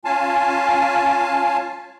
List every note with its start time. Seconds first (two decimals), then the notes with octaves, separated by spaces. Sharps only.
0.05 C#4 F4 F5 G#5 A5